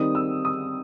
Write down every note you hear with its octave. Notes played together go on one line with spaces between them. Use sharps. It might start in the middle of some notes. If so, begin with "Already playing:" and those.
Already playing: D#3 G3 C4 D#4 D#6
E6
D#6